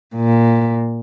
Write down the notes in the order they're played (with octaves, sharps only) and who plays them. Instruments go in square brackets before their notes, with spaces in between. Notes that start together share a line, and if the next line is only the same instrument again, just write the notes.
[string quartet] A#2